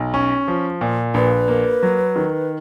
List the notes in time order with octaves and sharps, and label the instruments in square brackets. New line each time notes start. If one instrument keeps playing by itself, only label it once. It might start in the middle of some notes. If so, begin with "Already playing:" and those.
Already playing: [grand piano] B1
C#4
F3
A#2
[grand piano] A#1 [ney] B4
[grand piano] A#3
F#3
D#3